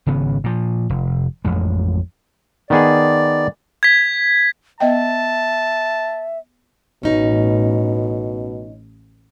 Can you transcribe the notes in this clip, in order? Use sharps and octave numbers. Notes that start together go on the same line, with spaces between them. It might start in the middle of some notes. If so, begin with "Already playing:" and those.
G#1 C#3 B3
A#2 F3
F1
A1 F2 G#3
D#3 B3 G#4 D5
G#6 B6
B3 D#5 E5 G5 A5
A1 B2 C#4 D#4